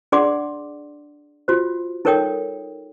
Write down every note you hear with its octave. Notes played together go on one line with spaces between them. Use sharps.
D4 G#4 D5 F#5 C6 D6
F4 F#4 C5
D#4 A4 A#4 C#5 G5 D#6